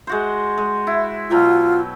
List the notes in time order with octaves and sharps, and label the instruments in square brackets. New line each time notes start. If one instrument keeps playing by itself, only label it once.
[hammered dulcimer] G#3 F#4 C5
G#3
E4
[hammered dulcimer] B2 F#3 G5 [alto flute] F4